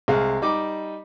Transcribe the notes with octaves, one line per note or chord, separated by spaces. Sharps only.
C2 G#3 F5
G3 D#4 D6